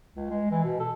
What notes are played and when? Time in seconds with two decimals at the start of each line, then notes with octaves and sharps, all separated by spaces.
0.16 C#2
0.30 G#3
0.51 E3
0.64 B2
0.80 A4